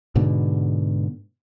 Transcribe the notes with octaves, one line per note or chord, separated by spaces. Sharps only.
G#2 B2 D3